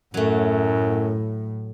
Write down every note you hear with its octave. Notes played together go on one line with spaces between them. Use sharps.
F#2 A2 F#3 A3